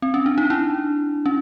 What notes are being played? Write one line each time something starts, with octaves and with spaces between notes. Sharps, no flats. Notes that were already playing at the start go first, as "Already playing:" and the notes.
C4
C#4
D4
D#4
D4 E4
C#4